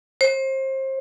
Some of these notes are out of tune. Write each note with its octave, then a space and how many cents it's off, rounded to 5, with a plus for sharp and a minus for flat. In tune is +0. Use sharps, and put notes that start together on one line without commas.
C5 +30